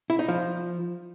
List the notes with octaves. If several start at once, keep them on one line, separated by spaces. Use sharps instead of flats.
E4
D#4
F3